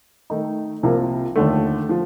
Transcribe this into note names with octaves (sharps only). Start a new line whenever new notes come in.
D#3 A3 D#4
C2 C3 F3 A#3
D#2 D3 A3
F3